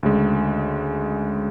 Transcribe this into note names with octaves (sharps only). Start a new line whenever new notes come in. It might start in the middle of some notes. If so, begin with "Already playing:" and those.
D2 C#3 G#3